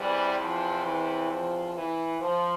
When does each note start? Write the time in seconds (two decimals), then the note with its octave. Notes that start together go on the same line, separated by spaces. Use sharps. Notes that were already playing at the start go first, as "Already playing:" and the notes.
Already playing: E2 C3 E3 G3
0.40 F3
0.84 E3
1.30 F3
1.75 E3
2.21 F3